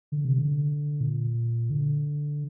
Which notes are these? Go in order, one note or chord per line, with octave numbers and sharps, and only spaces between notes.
D3
C3
D3
A#2
D3